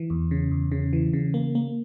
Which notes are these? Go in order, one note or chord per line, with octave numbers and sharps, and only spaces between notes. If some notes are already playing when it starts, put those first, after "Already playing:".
Already playing: E3
E2
C#3
E2
C#3
E3
C#3
A#3
A#3